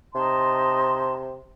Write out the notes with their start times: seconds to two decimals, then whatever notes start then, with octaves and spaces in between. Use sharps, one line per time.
0.15 C3 D#4 A5 C6